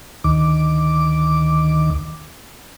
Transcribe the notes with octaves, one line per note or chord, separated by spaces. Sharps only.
D2 D#3 D6